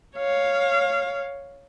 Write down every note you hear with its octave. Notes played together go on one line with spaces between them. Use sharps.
C#5 F5